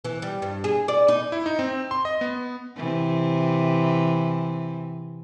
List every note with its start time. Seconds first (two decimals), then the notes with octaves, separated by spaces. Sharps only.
0.05 E3
0.22 G3
0.42 G2
0.64 G#4
0.88 D5
1.08 D#4
1.32 E4
1.46 D#4
1.59 C4
1.91 C6
2.05 D#5
2.21 B3
2.77 C3 E3